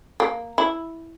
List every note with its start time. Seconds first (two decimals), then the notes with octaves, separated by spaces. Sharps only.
0.20 A#3
0.58 E4